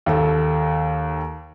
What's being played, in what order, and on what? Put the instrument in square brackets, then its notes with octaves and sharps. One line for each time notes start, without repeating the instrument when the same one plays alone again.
[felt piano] D#2 A4